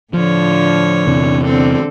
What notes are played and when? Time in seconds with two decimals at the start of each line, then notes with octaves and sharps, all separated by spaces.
0.14 A2 D3 F3 C#5
1.07 E2 C3 E3
1.44 D3 C4 A4